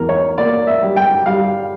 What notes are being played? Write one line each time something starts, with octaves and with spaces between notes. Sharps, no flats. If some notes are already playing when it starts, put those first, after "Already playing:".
Already playing: E2 A#4
C#5
A#3 D5
E5
G3
G5
G3 F5